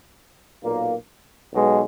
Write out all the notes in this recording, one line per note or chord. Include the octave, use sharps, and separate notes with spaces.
B1 A#2 A#3
B1 B2 G#3